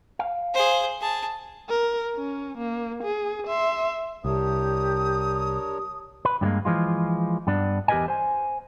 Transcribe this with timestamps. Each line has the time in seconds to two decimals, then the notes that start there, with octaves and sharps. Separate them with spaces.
0.19 F5
0.54 G#4 C5
1.00 G#4 A5
1.69 A#4
2.16 C#4
2.58 A#3
3.04 G#4
3.47 E5 C6
4.25 C2 D4 G4 A#4 C#5 D#6
6.25 B4
6.41 G2 G3 G#3 A#3
6.65 E3 F3 G#3 F4
7.47 G2 B3 D4
7.88 E2 G4 A#4 B4 D#5 G#5
8.08 C5 G#5